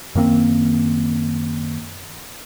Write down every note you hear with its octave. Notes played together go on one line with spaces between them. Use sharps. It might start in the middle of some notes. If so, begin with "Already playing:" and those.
F#2 D#3 A#3 C4